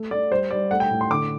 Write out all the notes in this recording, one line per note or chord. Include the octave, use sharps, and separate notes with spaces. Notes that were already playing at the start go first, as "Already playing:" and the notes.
Already playing: A3
A3 D5
G3 C5
G3 D5
A3 F#5
G5
A2
C6
D3 D6